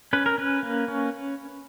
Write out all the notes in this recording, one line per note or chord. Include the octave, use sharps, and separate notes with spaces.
C#4 B4
A#4
C#4 B4
A#3
C#4